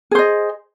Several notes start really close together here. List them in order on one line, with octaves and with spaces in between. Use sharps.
G#4 C5 D#5